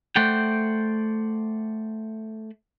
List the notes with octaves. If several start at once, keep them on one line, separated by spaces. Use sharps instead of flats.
A3 C5 D5 F#5 G5